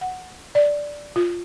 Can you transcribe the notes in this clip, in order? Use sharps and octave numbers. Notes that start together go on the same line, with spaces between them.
F#5
D5
F4